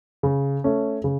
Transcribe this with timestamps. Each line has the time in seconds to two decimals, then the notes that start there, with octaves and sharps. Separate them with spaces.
0.23 C#3
0.64 A3 C#4
1.04 C#3